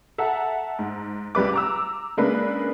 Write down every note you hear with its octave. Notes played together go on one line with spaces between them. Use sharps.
A4 E5 F#5 A5 A#5
G#2
C#2 G3 B4 D6
A#5 D6 E6
C#3 G#3 A#3 D4 B4